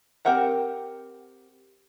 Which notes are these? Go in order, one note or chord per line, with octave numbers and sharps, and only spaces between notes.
C4 G4 A#4 F#5 A#5